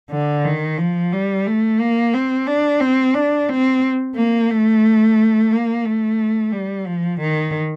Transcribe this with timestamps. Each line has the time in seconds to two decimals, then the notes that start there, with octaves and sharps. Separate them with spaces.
0.11 D3
0.45 D#3
0.78 F3
1.13 G3
1.46 A3
1.80 A#3
2.14 C4
2.47 D4
2.81 C4
3.14 D4
3.49 C4
4.16 A#3
4.50 A3
5.52 A#3
5.85 A3
6.52 G3
6.86 F3
7.21 D#3